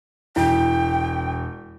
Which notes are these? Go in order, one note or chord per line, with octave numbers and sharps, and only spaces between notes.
E1 E4 G5